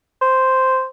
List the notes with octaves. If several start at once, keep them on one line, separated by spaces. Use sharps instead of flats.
C5